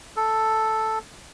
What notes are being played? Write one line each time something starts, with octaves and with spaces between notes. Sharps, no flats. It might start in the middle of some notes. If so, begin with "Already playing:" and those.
A4